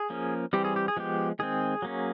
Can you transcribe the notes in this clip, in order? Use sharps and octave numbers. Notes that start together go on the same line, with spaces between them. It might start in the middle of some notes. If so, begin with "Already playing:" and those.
Already playing: G#4
F3 A#3 C#4
E3 G3 C4 G4
G#4
G4
G#4
F3 G#3 B3 G4
D#3 G#3 C4 G#4
F#3 A#3 C#4